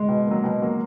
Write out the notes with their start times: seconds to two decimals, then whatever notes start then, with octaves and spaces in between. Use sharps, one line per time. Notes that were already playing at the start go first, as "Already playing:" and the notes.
Already playing: G#3
0.09 B2
0.27 F#3 A#3
0.44 B2
0.62 F#3 A#3